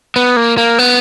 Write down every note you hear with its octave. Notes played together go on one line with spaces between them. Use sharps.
B3
A#3
A#3
B3